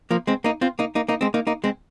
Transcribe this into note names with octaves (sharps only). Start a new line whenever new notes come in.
F3 A#3
G#3 C4
A#3 D#4
C4 F4
A#3 D#4
A#3 D#4
A#3 D#4
G#3 C4
A#3 D#4
A#3 D#4
G#3 C4